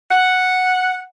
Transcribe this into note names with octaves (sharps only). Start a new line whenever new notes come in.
F#5